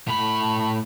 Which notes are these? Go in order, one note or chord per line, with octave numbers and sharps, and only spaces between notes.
A2 B5